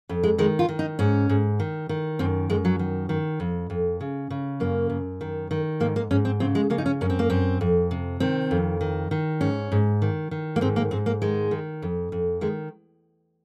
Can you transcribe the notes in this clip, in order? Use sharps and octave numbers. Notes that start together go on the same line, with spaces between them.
F2
G#3
D#3 G#3
F4
D#3
D#4
G#2 C#4
G#2
D#3
D#3
F#2 C4
F#2 G#3
F#3
D#3
D#3
F2
F2
C#3
C#3
F#2 A#3
F#2
D#3
D#3
G#2 A#3
A#3
G#2 C#4
C4
C#3 C4
G#3
C#3 A#3
D#4
C#4
F#2 C#4
C4
A#3
F#2 C4
F2
C3
D#3 C4
F2
D#3
D#3
G#2 C#4
G#2
D#3
D#3
A#3
G#2 C4
A#3
G#2 C4
A#3
D#3 G#3
D#3
F2
F2
D#3 G#3